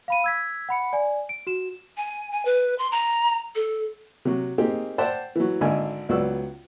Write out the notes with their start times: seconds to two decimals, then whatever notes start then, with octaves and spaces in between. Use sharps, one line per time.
0.08 F5 B5 D#7
0.24 E6 G#6 B6
0.69 F#5 B5 C#7
0.93 D5 G#5
1.29 D7
1.47 F#4 E7
1.97 G#5
2.31 G#5
2.45 B4
2.78 C6
2.92 A#5
3.55 A4
4.25 C3 F#3
4.58 A#3 C4 D#4 G4 G#4
4.98 C5 D5 E5 F#5 G5 A5
5.36 E3 F#3
5.61 G#1 D3 D#5 G#5
6.09 C#2 F#3 B3 D5 E6